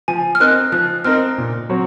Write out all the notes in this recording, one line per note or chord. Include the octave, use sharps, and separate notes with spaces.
F3 G#5
F6
C4 D#4 A#4 F#6
F3 F#6
C4 D#4 A#4 F6
A#2
F#3 C4 F#4 C#5